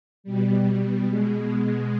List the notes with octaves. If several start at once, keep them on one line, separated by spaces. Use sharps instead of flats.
B2 G3
B2 G#3